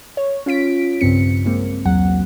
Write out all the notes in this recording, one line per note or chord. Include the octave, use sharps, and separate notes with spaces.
C#5
C#4 F4 B6 D7
B1 G2 C#3 C4 C#7
G#3 A#3 C4
B1 E2 F#3 F#5